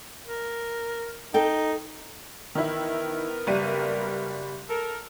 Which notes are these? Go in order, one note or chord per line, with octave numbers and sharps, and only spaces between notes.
A#4
D#4 A4 G5
D#3 E3 B3 E4 A#4
F#1 G3 D#7
A4 A#4